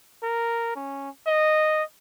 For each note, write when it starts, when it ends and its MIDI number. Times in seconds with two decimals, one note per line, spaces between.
0.23 0.72 70
0.75 1.09 61
1.27 1.83 75